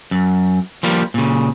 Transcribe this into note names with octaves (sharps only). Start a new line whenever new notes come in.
F#2
F3 G3 A#3
A#2 C#3